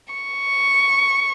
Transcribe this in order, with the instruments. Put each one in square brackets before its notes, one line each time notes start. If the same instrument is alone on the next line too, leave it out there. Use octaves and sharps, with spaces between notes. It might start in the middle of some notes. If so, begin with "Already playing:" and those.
[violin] C#6